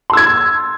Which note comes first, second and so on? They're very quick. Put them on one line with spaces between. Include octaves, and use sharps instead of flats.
C6 E6 G#6